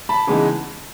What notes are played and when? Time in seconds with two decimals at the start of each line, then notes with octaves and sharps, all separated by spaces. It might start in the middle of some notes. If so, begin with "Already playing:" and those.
0.09 A5 B5
0.27 C#3 E3 G#3 B3 D#4